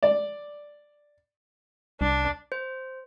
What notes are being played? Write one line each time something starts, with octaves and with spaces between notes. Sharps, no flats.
D5
C2 D4
C5